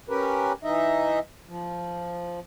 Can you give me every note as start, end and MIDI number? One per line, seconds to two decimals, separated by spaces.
0.09 0.53 61
0.09 0.53 67
0.09 0.53 70
0.09 0.53 71
0.63 1.19 52
0.63 1.19 63
0.63 1.19 75
0.63 1.19 76
1.47 2.40 53